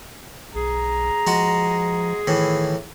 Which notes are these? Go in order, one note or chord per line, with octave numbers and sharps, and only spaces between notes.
B1 G#4 A#5
F3 G#3 F#4
A2 D#3 E3